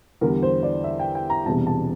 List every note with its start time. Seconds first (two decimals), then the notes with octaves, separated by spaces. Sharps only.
0.21 E2 D3 G3 A#4
0.43 C5
0.63 D5
0.84 E5
0.99 G5
1.15 G5
1.30 A#5
1.46 E1 E2 C3 G3 A5
1.67 A5